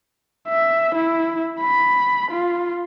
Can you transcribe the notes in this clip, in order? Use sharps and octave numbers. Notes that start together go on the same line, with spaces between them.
E5
E4
B5
F4